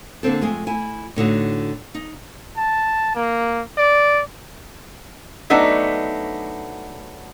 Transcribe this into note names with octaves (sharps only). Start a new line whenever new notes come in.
D3 A#3 C4 A4
F2 G#3 A3 G#4
E4 G#5
A2 D3 D#4 F#4
D#4
A5
A#3
D5
F#3 A3 B3 D4 D#4